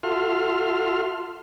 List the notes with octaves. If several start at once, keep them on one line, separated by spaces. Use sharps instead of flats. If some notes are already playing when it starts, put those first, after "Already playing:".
F4 F#4 A4 E5 C6 F6